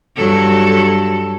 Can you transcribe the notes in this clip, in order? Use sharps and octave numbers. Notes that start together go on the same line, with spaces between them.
G2 F#3 A4